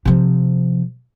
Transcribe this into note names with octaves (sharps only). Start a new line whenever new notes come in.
C3 F3